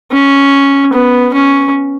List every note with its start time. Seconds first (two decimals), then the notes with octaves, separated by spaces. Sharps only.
0.12 C#4
0.93 B3
1.34 C#4